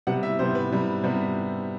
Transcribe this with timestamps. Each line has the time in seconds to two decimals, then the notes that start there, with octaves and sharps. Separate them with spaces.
0.07 C3 G3 B3 F#5
0.23 E5
0.39 C3 G3 B3 C5
0.55 B4
0.71 C3 G3 B3
1.03 C3 G3 B3